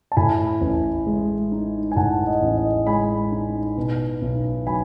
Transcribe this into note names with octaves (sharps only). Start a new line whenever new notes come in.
A5
A2 G#5 B5
A1
G#3
D#4
G#5
A2 F#5 A5
D#5
A1
D#5
G#3 G#5 B5
D#4
B2
B1
F#3 G#5 B5